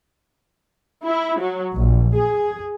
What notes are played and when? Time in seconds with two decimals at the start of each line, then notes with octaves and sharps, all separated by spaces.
1.05 E4
1.40 F#3
1.74 A#1
2.16 G#4